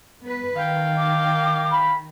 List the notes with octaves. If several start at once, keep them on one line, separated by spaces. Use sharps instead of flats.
B3 B4
D#3 F5 G5
D6
B5